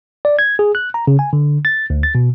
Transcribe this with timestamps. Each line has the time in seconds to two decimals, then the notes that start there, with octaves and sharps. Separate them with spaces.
0.25 D5
0.39 G#6
0.59 G#4
0.75 F#6
0.94 A#5
1.07 C#3
1.19 G#5
1.33 D3
1.65 A6
1.90 D2
2.03 A6
2.15 B2